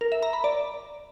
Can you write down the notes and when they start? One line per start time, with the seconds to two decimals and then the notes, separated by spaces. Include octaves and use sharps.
0.01 A#4
0.12 E5
0.22 A#5
0.33 B5
0.44 D5